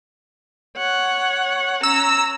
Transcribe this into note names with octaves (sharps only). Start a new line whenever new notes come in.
C#5 F#5
C#4 A#5 E6